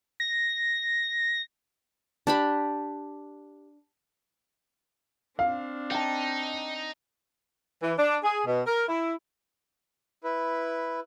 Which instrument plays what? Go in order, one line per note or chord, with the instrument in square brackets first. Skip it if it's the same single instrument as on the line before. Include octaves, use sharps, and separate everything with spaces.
[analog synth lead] A#6
[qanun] D4 G4 B5
[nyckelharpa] C4 D4 [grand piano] F5
[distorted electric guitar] D#4 [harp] G5 A5
[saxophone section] E3
D4
G#4
B2
A#4
E4
[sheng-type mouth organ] E4 B4